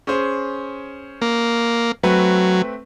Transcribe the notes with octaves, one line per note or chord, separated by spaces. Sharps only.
C#4 G#4 C5
A#3
F#3 A3 C4 B4